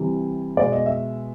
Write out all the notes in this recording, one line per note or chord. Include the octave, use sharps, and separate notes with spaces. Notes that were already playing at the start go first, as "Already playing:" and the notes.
Already playing: C3 E3 G3
B2 G#3 D5
D#5
E5